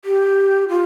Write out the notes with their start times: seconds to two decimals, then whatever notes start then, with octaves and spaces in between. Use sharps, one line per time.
0.05 G4
0.68 F4